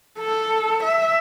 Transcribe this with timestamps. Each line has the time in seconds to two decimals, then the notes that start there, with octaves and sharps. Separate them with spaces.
0.19 A4
0.83 E5